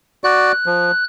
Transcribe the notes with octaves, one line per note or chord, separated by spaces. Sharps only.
F#4 D5 F#6
F3